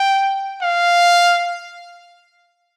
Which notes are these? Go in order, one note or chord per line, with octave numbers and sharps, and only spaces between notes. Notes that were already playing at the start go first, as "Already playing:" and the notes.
Already playing: G5
F5